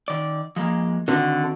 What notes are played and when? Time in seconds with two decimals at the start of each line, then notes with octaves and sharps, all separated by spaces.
0.08 D#3 D5
0.56 F3 G#3 A#3
1.08 D3 D#3 C4 F#4